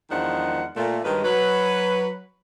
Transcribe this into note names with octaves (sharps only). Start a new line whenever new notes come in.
E2 D#3 F3 G#3 D4 F#5
A#2 A3
G2 D#3 F#3 G#3 B4
F#3 B4